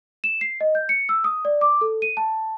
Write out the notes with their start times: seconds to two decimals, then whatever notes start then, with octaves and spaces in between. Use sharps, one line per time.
0.24 E7
0.41 C7
0.61 D#5
0.75 G6
0.89 C#7
1.09 E6
1.24 D#6
1.45 D5
1.61 D6
1.81 A4
2.02 D#7
2.17 A5